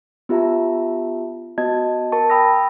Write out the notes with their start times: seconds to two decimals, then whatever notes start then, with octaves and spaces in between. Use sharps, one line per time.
0.29 B3 F4 G4 E5 A5 A#5
1.58 B3 F#4 D#5 A5 G#6
2.12 A#4 A5 C#6
2.30 G5 B5 D#6 E6 A#6